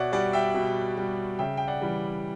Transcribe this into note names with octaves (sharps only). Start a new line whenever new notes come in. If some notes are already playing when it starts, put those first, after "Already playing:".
Already playing: B2 C#5 D5 E5 F#5
G3 D5 F#5
E5 G5
B2
G3
C#3 E5 G5
G5
D5 F#5
E3 G3